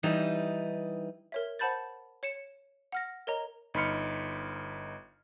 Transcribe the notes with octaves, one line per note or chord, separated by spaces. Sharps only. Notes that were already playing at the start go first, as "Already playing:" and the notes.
E3 G3 D#4
A#4 C#5 E5
C5 F#5 A5 B5 G6 A6
C#5 C#7 E7
F#5 F6 A#6
A#4 C#5 D#5 A#5
G1 D#4 B5 C6 F6 C#7